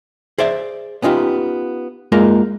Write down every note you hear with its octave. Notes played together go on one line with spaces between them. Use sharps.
G#4 C5 D5 E5
B3 C#4 D#4 F4 G4
G#3 A#3 D#4 F4 A#4